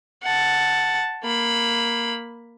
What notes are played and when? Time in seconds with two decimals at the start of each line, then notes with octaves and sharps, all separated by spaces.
0.22 F#5 A5
1.23 A#3 B5